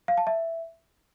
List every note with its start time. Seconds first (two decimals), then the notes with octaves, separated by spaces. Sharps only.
0.08 F5
0.17 A5
0.27 E5